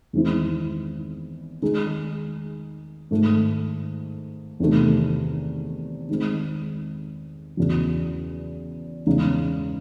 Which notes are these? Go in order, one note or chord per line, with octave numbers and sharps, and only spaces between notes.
E2 D#3 G#3 C4 E4
D#3 G#3 D#4 G#4
G#2 D#3 A3
E2 C3 D#3 A3
D#3 G#3 C4
E2 C#3 F#3
E2 C#3 G#3 D#4